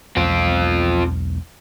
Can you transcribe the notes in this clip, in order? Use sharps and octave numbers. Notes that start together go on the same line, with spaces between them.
B1 E2 G#3 C4 F4